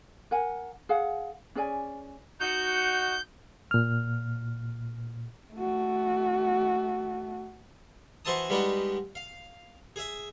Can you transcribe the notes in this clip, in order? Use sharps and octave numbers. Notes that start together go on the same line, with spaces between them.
A#4 F#5 G#5
G#4 F5 F#5
C#4 G#4 D5 G#5
D#4 F#4 G6
A#2 F6
A3 F#4
E3 F#4 C5 E5 A5 D#6
G3 G#3 B3 D4 D#4 F#4
F5
G#4 E5